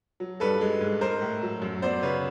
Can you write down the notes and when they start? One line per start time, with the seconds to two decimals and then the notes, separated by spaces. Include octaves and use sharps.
0.20 F#3
0.40 G2 A4 B4
0.61 G#3
0.81 G#2
1.01 G#3 A#4 C5
1.22 A2
1.43 F#3
1.62 F#2
1.82 B3 C5 D5
2.03 C#3 B4 C#5